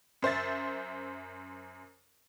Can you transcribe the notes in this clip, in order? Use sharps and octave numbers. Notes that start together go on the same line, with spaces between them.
F#2 C5 E5 A6